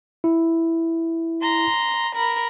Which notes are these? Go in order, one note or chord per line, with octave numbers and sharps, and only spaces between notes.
E4
A#5 C6
A#4 B5